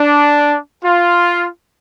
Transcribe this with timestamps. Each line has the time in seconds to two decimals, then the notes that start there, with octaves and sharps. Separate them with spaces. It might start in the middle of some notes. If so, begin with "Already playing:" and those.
Already playing: D4
0.83 F4